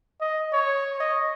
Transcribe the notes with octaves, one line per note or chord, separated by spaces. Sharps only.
D#5
C#5
D#5